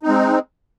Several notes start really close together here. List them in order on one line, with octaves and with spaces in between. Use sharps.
D#4 C4 G#3